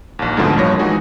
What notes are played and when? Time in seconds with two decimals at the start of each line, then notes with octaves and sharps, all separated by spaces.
0.19 A#1 D#2
0.37 D2 G#2 B2 D3 F3 C4
0.56 A1 G2 F3 A#3 C#5 A#6
0.79 E3 G#3 D#4 F#4 G#4